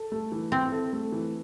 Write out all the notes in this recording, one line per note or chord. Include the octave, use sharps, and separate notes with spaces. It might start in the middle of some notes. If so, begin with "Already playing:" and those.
Already playing: A4
A3
E3
C4 E4
A4
A3
E3